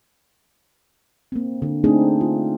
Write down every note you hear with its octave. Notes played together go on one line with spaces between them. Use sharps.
A#3 C4
D3
A3 C4 D4 D#4 G#4
F4